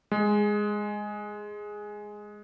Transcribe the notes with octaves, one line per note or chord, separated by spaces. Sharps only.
G#3